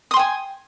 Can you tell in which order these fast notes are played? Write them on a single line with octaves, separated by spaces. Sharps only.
D#6 C6 G5 G#5